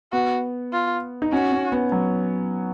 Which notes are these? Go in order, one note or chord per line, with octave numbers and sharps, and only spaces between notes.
B3 F#4
F4
D#4
C#4 F#4
C#4
B3
F#3